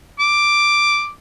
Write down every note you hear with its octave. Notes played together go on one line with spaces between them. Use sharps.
D6